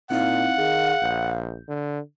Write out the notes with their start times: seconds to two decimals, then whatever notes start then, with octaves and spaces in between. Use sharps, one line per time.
0.11 A#2 C4 D#4 E4 F5 F#5
0.58 D#3 G#4
1.02 A#1 G6
1.68 D3